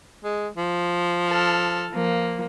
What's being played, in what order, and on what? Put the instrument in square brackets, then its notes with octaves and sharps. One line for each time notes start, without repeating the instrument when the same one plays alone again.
[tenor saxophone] G#3
F3
[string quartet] A4 F6
F3 A#3